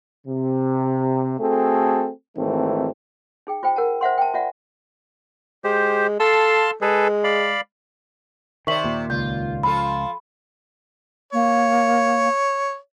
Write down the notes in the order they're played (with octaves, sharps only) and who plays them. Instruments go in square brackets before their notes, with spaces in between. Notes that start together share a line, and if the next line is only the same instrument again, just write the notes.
[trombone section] C3
A3 C4 F#4 G#4 A4
G#1 D#3 E3 A3 C4
[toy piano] D#4 G#4 G5
F4 C5 G5
A#4 F#5 A5
C5 E5 F#5 C6
G5 A5
F4 D5 E5 F#5
[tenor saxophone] G#3 [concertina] G4 C5
[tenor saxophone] A4 [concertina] F5 A5 C6
[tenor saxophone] G#3 [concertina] G#4 A4 B4
[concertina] D5 F5 B5
[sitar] C3 C5 D5 [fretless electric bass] D#3 [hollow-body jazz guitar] A#4 E5 [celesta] C#6 F#7
[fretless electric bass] D#2 A#2
[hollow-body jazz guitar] C#2 [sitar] F4 [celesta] G6
[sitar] F3 F4 A4 [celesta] B5
[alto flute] A#3 [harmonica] C#5